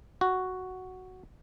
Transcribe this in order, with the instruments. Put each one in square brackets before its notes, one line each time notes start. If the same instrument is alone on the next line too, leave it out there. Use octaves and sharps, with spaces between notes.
[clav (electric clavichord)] F#4